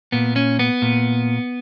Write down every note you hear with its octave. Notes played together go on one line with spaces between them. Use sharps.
A#2 B3
C#4
B3
A#2